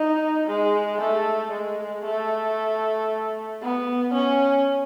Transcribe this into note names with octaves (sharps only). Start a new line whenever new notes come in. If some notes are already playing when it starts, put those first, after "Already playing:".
Already playing: D#4
G#3
A3
G#3
A3
B3
C#4